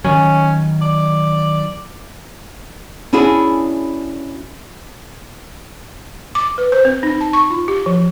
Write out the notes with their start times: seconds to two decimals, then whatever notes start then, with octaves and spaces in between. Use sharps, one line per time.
0.04 D#3 F#3 C#4
0.81 D5
3.13 C#4 D4 E4 F#4 G#4
6.35 D6
6.58 B4
6.72 C5
6.85 C4
7.03 D#4
7.21 A5
7.33 C#6
7.50 F4
7.68 G4
7.86 F3